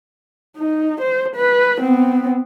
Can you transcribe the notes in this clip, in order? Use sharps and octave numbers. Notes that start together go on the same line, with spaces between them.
D#4
C5
B4
B3 C4